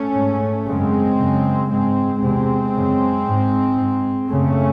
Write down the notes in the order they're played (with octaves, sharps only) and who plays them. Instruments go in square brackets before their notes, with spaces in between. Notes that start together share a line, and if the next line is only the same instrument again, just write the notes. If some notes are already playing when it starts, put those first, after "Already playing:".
Already playing: [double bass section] A3 C#4
G#2
F#2 C#3 G#3 C4
F#2 C#3
G#2 G#3 C4
E2 C3 G#3 C4
F#2 C#3
G#2
G#2
F#2 C#3 A3 C#4